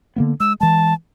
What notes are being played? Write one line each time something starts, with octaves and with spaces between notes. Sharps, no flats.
D3 A#3 B3
G#3 E6
E3 G#3 A5